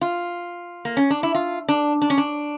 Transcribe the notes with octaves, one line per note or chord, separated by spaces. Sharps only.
F4
A#3
C#4
D4
E4
F4
D4
D4
C#4
D4